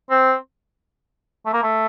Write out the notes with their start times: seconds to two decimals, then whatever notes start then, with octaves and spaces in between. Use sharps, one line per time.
0.10 C4
1.46 A3
1.53 A#3
1.63 A3